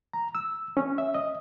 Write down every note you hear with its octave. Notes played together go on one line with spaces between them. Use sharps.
A#5
E6
C#4
E5
D#5